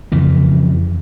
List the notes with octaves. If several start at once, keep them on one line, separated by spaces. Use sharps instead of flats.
F2 C#3 E3